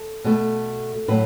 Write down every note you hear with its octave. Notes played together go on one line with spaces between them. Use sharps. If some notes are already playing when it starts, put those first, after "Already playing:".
Already playing: A4
B2 A3
A2 F#3 B4